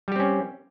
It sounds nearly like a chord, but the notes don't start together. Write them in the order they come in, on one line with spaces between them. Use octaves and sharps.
G3 G4 C4 C#4